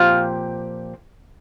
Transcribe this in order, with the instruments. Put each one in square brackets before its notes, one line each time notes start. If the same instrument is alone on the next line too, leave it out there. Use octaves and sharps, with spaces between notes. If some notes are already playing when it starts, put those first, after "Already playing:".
Already playing: [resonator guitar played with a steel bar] A#2 F3 C4 G4 [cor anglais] F4